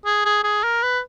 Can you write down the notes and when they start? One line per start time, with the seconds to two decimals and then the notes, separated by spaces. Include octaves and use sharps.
0.06 G#4
0.25 G#4
0.44 G#4
0.64 A#4
0.83 B4